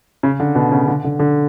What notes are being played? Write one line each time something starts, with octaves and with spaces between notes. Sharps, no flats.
C#3
D3
B2
C#3
D3
D3
D3